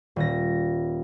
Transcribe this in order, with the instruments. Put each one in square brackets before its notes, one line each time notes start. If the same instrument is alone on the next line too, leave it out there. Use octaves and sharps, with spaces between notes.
[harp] D#1 A#6